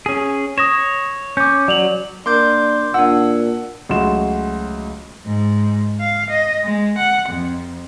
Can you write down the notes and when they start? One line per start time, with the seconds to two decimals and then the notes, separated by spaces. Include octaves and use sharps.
0.06 C#4 G#4
0.58 C#5 D#6 A#6 E7
1.37 C#4 D6 G6
1.68 F#3 D5 F7 F#7
2.26 A#3 D4 C6 D6 G6
2.94 A#2 D4 F#5 E6
3.89 C#2 F#3 A3 F#4 C6 E7
5.25 G#2
5.99 F5
6.29 D#5
6.63 G#3
6.98 F#5
7.28 F2